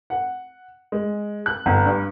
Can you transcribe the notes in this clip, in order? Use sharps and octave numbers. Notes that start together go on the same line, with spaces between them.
F#5
G#3
F#6
G1
G2